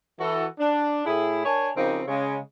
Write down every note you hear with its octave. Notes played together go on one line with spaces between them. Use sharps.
E3 F#4 A4
D4
A2 E4 G#4
D4 A#4 C#5 G#5
C#3 F3 C4 D#4 G4 A#4
C#3 G#3